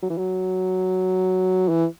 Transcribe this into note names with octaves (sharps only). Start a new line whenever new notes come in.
F#3
E3
F#3
E3